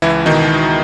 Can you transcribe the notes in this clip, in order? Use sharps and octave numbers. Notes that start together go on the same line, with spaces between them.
C#2 E3 E4
B2 D#3 D#4
C#2